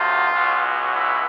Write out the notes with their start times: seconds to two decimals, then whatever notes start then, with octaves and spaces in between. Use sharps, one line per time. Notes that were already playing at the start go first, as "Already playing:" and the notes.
Already playing: D2 C3 D#3 F#3 F4
0.32 C#2 B2 F#3
0.94 E4